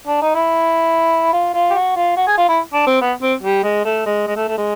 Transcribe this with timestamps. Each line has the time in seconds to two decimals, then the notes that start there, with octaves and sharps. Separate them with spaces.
0.07 D4
0.22 D#4
0.35 E4
1.33 F4
1.54 F4
1.70 G4
1.74 F#4
1.96 F4
2.16 F#4
2.27 G#4
2.37 F4
2.48 E4
2.73 D4
2.87 C4
3.01 B3
3.22 C4
3.43 G3
3.63 G#3
3.85 A3
4.06 G#3
4.27 G#3
4.36 A3
4.48 A3
4.58 G#3